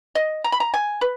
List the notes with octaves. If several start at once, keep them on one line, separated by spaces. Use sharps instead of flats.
D#5
A#5
B5
A#5
G#5
B4